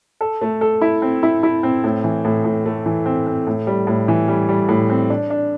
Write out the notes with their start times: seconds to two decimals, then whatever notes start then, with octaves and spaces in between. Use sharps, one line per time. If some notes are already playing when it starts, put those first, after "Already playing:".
0.21 A4
0.42 A3
0.61 A4
0.82 E4
1.02 C4
1.23 E4
1.43 E4
1.63 C4
1.84 A2
2.04 E3
2.25 A2
2.44 A2
2.65 A3
2.86 E3
3.06 C4
3.27 C4
3.47 A2
3.67 G3
3.87 A2
4.08 E3
4.28 G3
4.49 G3
4.69 A2
4.90 C4
5.10 D4
5.30 D4